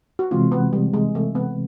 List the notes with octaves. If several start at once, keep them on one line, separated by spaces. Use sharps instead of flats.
F#4
C3 E3 G#3 C4 F4
B3
G3
G#3
A3
B3